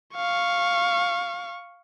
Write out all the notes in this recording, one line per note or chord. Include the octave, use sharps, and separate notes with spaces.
F5 C#6